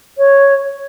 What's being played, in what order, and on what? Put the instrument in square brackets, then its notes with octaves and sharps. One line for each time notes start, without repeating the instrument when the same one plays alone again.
[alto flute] C#5